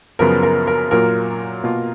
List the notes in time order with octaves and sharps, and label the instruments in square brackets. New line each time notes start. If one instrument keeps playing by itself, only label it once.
[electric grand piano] F#2 C#3 F3 B3 [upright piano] A#4
[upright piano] A#4
A#4
[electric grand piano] A#2 F#3 A#3 F4 [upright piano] A#4
[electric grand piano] B2 A#3 F4